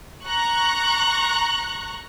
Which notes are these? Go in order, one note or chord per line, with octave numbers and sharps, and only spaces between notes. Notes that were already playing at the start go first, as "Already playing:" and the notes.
A#5 C#6 F#6